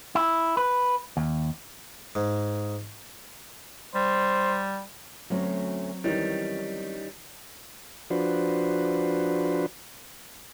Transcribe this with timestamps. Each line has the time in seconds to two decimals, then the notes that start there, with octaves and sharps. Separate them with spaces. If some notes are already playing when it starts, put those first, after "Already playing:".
0.15 E4
0.57 B4
1.17 D#2
2.15 G#2
3.95 G3 C5
5.30 D2 F#3 A3 C4 C#4 F#4
6.04 D#3 E3 G3 C#4 D#4
8.10 F3 D4 F#4 B4 C5